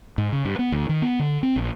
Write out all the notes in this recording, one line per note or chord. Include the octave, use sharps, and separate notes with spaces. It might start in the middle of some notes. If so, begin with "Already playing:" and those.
G#2
C#3
G2
B3
D2
D#3
B3
D3
C4
A#1